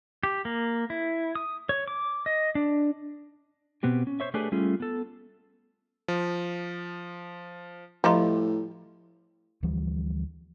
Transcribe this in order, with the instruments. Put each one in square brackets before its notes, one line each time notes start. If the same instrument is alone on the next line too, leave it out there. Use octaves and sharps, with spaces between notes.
[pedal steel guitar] G4
A#3
E4
D#6
C#5
D6
D#5
D4
[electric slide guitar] B2 B3 C4 G4
C#4
C5 C#5 E5
A3 D4 G4 G#4 B4 C#5
G3 A3 C#4 F4 G#4
B3 A4
[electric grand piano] F3
[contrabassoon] A2 [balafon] F3 D#5 A#5 [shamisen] G3 A3 F4
[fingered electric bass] D2 E3 F3 G3